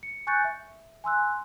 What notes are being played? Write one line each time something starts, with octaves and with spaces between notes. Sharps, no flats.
C#7
G#5 C#6 F#6 G6 A6 C#7
E5
G#5 C6 E6 F#6